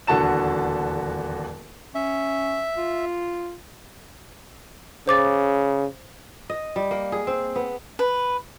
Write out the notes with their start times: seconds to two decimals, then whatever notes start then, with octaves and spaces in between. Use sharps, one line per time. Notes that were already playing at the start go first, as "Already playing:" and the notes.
0.07 D#1 E2 D3 F#4 A5 E7
1.95 C#4 E5
2.78 F4
5.08 C#3 C5 D6 A6
6.50 D#5
6.76 G3
6.91 A#3
7.12 G#4
7.27 C4
7.56 B3
7.99 B4